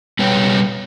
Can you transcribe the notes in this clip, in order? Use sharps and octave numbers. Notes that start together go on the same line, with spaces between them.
B2 G3 B4 C#5 G5